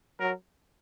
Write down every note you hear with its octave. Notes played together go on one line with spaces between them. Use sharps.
F#3 A#4